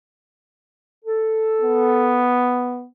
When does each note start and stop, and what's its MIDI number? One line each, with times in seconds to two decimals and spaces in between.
1.05 2.25 69
1.61 2.86 59